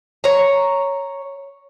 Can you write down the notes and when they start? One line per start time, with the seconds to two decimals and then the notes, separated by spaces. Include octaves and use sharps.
0.24 C#5 A#5